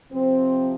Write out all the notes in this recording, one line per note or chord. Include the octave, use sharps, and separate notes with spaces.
C3 F3 C4